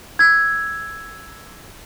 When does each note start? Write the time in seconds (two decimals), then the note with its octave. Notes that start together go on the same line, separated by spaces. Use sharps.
0.19 E6 G#6